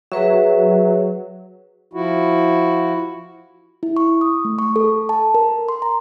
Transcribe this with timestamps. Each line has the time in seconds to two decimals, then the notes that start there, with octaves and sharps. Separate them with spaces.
0.12 F#3 G#4 B4 E5
1.93 F3 E4 F#4
3.83 E4
3.97 C#6
4.21 D#6
4.45 A3
4.59 C#6
4.76 A4
5.09 A5
5.34 A#4
5.69 C6
5.82 A#5